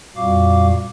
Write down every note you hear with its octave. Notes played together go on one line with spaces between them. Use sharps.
F2 A#2 G3 F#4 F5 D6